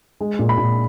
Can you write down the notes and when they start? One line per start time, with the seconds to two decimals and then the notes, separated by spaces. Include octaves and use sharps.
0.21 G#3
0.39 A#2
0.49 B5
0.58 A#2